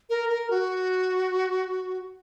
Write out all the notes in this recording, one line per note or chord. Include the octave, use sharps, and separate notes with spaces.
A#4
A#4
F#4